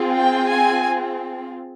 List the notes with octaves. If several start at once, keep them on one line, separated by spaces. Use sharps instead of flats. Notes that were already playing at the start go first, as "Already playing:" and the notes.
Already playing: C4 F4 G#4
G5
G#5